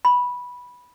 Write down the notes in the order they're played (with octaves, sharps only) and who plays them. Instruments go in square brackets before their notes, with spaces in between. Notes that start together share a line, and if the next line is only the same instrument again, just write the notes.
[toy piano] B5